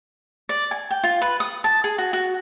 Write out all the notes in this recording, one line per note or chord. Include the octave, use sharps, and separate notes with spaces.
D5
G#5
G5
F4
B4
D#6
A5
G#4
F#4
F#4